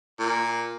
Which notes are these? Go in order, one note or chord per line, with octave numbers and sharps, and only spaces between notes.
A#2